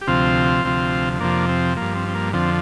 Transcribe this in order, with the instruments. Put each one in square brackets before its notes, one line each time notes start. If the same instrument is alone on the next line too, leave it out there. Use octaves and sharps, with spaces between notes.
[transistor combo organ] G4
D2 C3 F3 C4 F4
D2 C3 F3
F2 C3 F3 A#3 D4
C4
G2 F3 A#3
C4
C4
A#3
F2 D3 F3 C4